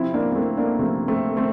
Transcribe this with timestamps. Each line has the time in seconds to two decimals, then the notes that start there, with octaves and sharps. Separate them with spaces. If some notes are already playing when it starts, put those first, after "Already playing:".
Already playing: C3 F3 C4 E4
0.14 A#3 D4
0.32 A#3
0.35 A3 C4
0.57 A#3 D4
0.79 C3 F3 A3 C4
1.08 A3 C4
1.37 A3 C4